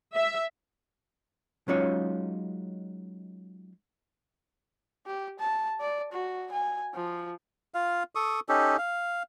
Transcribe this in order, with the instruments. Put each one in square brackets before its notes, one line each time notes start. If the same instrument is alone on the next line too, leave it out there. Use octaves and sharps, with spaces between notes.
[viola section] E5
[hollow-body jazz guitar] F#3 G#3 C#4 D#4 F4 C#5
[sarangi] G4
A5
D5
F#4
G#5
F3
[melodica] F4 F5
A4 C#6 D#6
C#4 D#4 G4 A4
F5